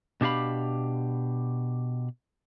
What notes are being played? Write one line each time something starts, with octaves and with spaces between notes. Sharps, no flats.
B2 D4 G4 F5 B5